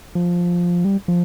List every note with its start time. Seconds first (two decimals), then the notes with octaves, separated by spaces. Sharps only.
0.15 F3
0.85 G3
1.08 F3